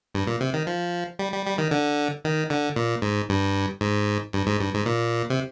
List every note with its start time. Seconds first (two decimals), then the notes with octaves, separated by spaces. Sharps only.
0.15 G2
0.27 A#2
0.41 C3
0.54 D#3
0.67 F3
1.19 G3
1.33 G3
1.46 G3
1.58 D#3
1.71 D3
2.25 D#3
2.50 D3
2.76 A#2
3.02 G#2
3.29 G2
3.81 G#2
4.33 G2
4.47 G#2
4.60 G2
4.73 G#2
4.86 A#2
5.30 C3